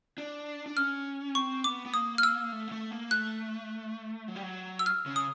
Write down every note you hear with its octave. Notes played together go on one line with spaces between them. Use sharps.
D4
D4
C#4 F6
C4 C#6
B3 D6
B3
A#3 D#6
F6
E6
A3
A#3
A3
A#3
A3 F#6
F#3
G3
F#3
E6
F6
C#3
D#6